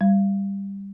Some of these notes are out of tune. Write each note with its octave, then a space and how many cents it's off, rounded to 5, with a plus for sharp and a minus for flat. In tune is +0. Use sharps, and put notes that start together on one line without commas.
G3 +15